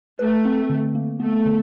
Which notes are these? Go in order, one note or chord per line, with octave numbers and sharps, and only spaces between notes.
A3 B4
C4
D3
A#3
A3 B3
D3